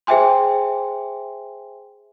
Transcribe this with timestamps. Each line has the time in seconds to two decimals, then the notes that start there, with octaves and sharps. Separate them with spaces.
0.07 G#4 C5 E5 G5 G#5 C6